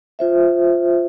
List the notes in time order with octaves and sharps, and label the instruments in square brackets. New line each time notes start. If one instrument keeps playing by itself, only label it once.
[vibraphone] F4 C5 E5